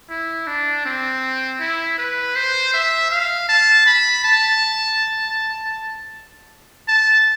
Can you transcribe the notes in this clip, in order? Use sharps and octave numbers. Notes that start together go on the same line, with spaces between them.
E4
D4
C4
E4
B4
C5
E5
F5
A5
B5
A5
A5